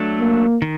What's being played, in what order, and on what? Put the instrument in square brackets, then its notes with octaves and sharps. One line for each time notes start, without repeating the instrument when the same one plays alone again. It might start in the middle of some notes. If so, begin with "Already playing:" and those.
Already playing: [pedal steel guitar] F#3 A3 D4
[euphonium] A#3
[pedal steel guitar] D#3